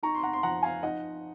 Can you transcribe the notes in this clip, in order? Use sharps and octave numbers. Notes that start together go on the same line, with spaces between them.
D#4 A#5 C#6
C6
F#5 A#5
C6
F3 F#5 A#5
F5 G#5
D#4 D#5 F#5